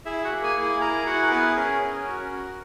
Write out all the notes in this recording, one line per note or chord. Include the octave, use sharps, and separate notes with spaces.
E4 G#4 E5
F#4 F#5
A#3
G#4 G#5
E4
G#4 G#5
G#4 A#4 A#5
E4 F#4 F#5
A#4
B3 G#4 B4
C#4 A#4
C#4
F#4
F#4